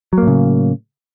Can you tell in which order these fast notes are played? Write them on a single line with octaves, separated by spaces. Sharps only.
F#3 A#3 A2 C#3